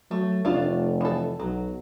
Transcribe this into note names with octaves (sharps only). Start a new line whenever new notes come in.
F#3 A3
F1 A3 D4 F4
E3 A4
B1 F#3